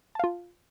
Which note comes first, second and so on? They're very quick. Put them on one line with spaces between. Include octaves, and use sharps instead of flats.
A5 F5 F4